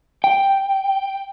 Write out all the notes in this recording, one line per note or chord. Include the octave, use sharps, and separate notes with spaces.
G5